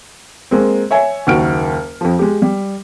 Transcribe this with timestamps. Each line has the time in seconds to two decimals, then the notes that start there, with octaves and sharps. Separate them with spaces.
0.51 G#3 A#3 C4
0.91 C#5 E5 G#5
1.27 F#1 D#2 F#4 F6 D7
2.01 F2 F3
2.19 G#3 G4
2.42 G3